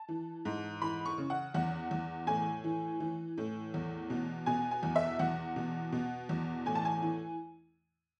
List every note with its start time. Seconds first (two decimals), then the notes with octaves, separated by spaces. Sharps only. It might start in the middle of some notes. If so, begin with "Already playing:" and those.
Already playing: A5
0.09 E3
0.45 G#2
0.81 E3 B5
1.06 C#6
1.18 C#3
1.30 F#5
1.54 E2 F#5
1.91 E2
2.27 A2 G#5
2.64 E3
3.00 E3
3.38 A2
3.74 E2
4.10 B2
4.46 B2 G#5
4.71 G#5
4.83 E2
4.96 E5
5.19 E2 F#5
5.56 B2
5.92 B2
6.29 E2
6.66 A2 G#5
6.75 A5
6.85 G#5
7.02 E3